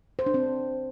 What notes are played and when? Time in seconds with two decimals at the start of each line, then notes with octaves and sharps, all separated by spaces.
0.19 C5
0.26 D4
0.34 C4